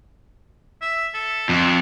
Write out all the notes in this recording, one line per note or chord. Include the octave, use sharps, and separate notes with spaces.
E5
A4
F2 D4